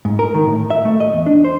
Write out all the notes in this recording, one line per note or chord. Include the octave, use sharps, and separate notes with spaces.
G#2
A#4
D#3
A2
E5
A3
D#5
E2
D4
C5